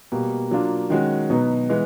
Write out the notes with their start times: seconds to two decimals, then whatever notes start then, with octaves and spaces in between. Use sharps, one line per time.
0.12 B2 G3 A#3
0.51 F#3 A#3 D4 F4
0.90 D#3 G#3 C#4 F#4
1.30 B2 F#3 B3 D#4
1.69 E3 G#3 B3